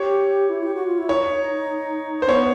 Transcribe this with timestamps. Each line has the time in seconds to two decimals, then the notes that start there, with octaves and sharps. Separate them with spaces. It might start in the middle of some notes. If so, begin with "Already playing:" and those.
Already playing: G4 C#5
0.49 E4
0.63 G4
0.75 F#4
0.86 F4
0.98 E4
1.09 D#4 C#5
2.22 C5
2.28 B3 C#5